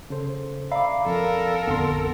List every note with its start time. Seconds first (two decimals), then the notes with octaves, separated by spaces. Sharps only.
0.10 C#3 A4 C5
0.71 D5 E5 F5 A#5 B5 D6
1.06 F2 A4 A#4
1.67 A1 F2 D3 B3 C6